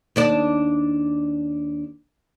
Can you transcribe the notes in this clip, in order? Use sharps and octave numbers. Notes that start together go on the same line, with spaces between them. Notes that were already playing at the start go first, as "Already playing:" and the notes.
D#2 D4 D5